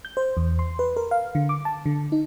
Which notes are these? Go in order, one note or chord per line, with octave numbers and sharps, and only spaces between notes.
G6
C5
E2
C6
B4
A#4
F5
D3
D6
A5
D3
D#4